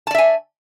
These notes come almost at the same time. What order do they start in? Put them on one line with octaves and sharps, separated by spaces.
A5 D5 E5 G#5